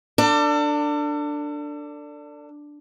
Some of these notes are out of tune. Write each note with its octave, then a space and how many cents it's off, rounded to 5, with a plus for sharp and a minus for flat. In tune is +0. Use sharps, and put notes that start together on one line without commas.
D4 +0 A4 +35